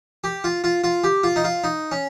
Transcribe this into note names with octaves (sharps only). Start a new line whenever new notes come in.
G4
F4
F4
F4
G4
F4
D#4
F4
D#4
C#4